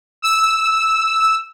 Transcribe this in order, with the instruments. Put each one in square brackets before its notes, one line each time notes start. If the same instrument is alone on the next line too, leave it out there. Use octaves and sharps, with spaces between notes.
[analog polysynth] E6